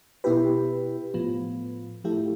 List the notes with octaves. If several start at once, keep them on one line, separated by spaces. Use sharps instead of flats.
B2 B3 E4 G4 B4
A2 F3 B3
A2 F3 A3 E4 G4